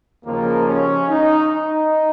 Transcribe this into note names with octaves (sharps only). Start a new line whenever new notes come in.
D#2 C#3 F3 A#3
C#4
D#4
D#4